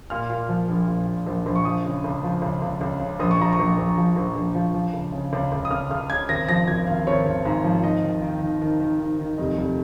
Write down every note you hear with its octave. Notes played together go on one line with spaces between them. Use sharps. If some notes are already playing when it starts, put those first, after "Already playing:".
A#2 F6
A#2
F3
A#1
A#2
A#2
A#1
A#1
C#6
F3 D#6
C#3
C#2
F3
C#2
C#2
C#2
C#3
A#1 D#6
C#6
F3 A#5
C#6
A#1
A#1
F3
A#1
A#1
F3
F3
C#2
C#3
C#2
C#2
D#6
C#2 F6
C#2 F6
C#3 G#6
G#1 A#6
F3 A#6
G#1 G#6
G#1 F5
G#1 C#5
G#1
G#2
F3
D#3 D#5
D#2
D#3
D#3
D#3
D#3
D#3
D#3
F1 D#5
F1